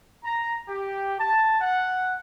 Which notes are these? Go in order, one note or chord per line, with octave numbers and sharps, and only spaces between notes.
A#5
G4
A5
F#5